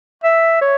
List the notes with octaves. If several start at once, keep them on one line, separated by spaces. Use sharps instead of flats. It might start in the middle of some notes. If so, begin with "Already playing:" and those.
E5
C#5